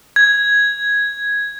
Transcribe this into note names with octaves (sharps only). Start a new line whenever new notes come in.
G#6